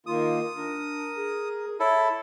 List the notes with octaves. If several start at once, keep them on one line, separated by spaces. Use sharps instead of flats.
D#3 A#3 F4 D#6
D4 A#4
G#4
E4 A4 C#5